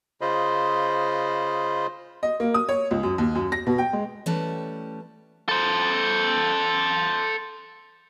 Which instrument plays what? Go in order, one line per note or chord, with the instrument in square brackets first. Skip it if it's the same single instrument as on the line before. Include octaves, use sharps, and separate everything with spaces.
[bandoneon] C#3 F4 C5 D#5 B5
[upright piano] D#5
A#3
D#6
C#5
C#2
F#2
D#2
F#2
A#6
B2
G5
G#3
[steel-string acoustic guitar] E3 G3 A3 C#4 B4 A5
[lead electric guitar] A4 C5